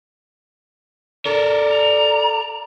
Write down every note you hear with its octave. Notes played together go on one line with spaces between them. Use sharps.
A4 A#4 D5
A#5